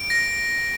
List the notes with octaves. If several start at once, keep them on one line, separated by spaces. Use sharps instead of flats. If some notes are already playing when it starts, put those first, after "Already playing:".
Already playing: D7
A#6